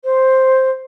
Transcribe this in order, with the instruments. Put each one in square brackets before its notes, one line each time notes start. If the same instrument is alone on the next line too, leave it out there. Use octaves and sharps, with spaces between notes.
[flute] C5